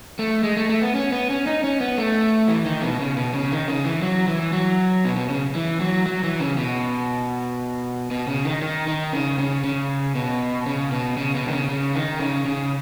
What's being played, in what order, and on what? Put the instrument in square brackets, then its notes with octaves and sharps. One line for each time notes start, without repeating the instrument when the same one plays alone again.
[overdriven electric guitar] A3
G#3
A3
A3
B3
C#4
B3
C#4
D#4
C#4
B3
A3
E3
D#3
B2
C#3
B2
C#3
D#3
C#3
E3
F#3
E3
F#3
B2
B2
C#3
E3
F#3
F#3
E3
C#3
B2
B2
C#3
D#3
D#3
D#3
C#3
C#3
C#3
B2
C#3
B2
C#3
B2
D#3
C#3
C#3
D#3
C#3
C#3